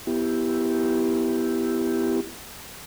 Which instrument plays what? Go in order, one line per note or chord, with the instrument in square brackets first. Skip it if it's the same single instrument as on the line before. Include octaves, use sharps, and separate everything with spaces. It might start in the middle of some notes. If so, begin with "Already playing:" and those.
[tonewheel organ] B3 E4 G4